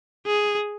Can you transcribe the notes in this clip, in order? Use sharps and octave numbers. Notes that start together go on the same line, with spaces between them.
G#4